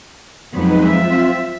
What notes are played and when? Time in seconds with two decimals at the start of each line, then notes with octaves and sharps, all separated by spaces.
0.53 F2 F#3 G#3 B3 D#4 B4
0.86 C4 F4 E5